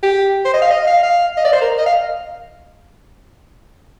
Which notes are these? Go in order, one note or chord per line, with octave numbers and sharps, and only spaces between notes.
G4
C5
D#5
F5
D#5
F5
F5
D#5
D5
C5
A#4
D#5
F5